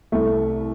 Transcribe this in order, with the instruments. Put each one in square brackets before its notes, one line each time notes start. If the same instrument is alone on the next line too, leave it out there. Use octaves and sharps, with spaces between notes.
[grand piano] C2 A3